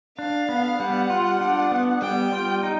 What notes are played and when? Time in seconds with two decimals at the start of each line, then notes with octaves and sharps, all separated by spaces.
0.18 D4 F5
0.49 B3
0.80 G3 F#5
1.10 F4
1.41 D4
1.71 B3
2.02 G3 G5
2.32 F4
2.63 D#4